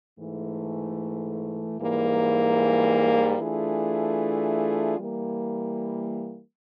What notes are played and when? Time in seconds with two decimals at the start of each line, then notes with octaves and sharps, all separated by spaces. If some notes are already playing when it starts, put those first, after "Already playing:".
0.19 G#2 E3 A3
1.79 G#2 E3 G3 A#3
3.39 E3 A3 D4 F4 G#4
4.98 E3 G3 A#3